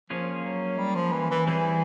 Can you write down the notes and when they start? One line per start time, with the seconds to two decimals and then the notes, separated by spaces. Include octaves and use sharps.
0.10 F3 A#3 C#4 F4 G#4 C#5
0.45 F#3
0.78 G3
0.95 F3
1.13 E3
1.31 E3
1.46 E3 G3 C4 E4 G#4